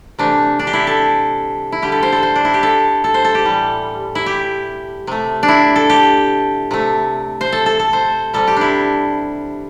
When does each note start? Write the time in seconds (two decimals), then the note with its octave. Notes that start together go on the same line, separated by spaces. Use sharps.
0.19 C3 E3 A3 D4
0.59 D4
0.67 G4
0.73 E4
0.87 A4
1.72 E4
1.82 D3 G3 G4
1.92 A4
2.03 C5
2.12 A4
2.23 C5
2.36 D4
2.45 E4
2.54 G4
2.63 A4
3.04 A4
3.14 C5
3.25 A4
3.35 G4
3.45 A2 E3 G3
4.15 E4
4.26 G4
5.07 C3 A3
5.43 D4
5.48 E4
5.76 A4
5.89 G4
6.71 C3 A3
7.41 C5
7.52 A4
7.66 A4
7.79 A4
7.93 C5
8.33 C3 G3 A4
8.47 G4
8.57 D4 E4